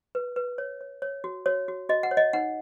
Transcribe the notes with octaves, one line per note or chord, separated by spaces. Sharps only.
B4
B4
C#5
C#5
C#5
F#4
F#4 C#5
F#4
F#4 D#5
F#5
C#5
D#5
D#4 F#5